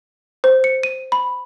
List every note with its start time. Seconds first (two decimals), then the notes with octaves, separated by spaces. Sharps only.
0.44 C5
0.64 C#7
0.83 D#7
1.12 B5